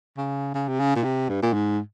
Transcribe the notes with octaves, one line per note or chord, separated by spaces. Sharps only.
C#3
C#3
C3
C#3
A#2
C3
G2
A#2
G#2